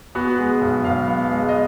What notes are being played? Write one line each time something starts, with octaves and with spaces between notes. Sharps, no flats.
B3 F#4
G#3
B1
B1 F5
B3
G#3
D#5